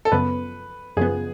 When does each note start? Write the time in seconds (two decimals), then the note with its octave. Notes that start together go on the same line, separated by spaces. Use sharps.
0.05 A4
0.12 F#2 C#3 F3 B3 B4
0.97 F#2 C#3 F3 B3 G#4